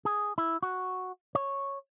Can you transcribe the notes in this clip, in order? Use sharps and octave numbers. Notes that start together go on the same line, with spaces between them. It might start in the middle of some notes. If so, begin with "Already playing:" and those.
G#4
E4
F#4
C#5